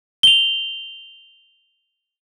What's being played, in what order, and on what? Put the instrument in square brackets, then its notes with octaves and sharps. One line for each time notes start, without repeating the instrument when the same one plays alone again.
[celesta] F7 G7